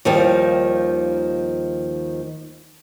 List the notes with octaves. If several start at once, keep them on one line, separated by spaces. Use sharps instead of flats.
D#2 D#3 F3 G3